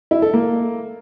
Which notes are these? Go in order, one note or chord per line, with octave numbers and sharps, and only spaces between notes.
E4
A4
A#3